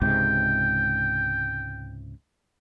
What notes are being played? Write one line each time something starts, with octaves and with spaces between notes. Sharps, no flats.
C#2 G#2 C3 G5